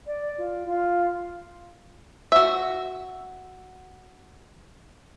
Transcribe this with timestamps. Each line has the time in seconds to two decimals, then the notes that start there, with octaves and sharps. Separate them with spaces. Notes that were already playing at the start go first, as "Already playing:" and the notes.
0.06 D5
0.37 F4
0.65 F4
2.32 F#4 E5